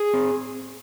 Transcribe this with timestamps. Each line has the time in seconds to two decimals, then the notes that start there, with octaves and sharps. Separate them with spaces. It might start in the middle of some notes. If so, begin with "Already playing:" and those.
Already playing: G#4
0.14 C4